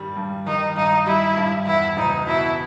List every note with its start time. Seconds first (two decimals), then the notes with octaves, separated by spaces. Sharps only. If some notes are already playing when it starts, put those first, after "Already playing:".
Already playing: G2 D#3 G3
0.17 G2
0.47 D#3 D#4
0.76 G2 D#4
1.06 G3 E4
1.37 G2
1.67 E2 E4
1.97 F#1 D#4
2.27 B2 E4